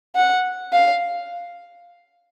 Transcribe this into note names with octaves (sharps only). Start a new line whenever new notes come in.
F#5
F5